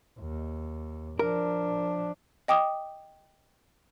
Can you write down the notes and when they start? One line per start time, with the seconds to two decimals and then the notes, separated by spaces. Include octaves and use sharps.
0.19 D#2
1.19 F3 D4 A#4
2.48 D#5 G5 D6 D#6